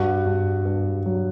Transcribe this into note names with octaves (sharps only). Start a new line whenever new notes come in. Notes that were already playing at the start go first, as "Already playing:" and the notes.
Already playing: G2 F#4 F#5
G2
G2
F#3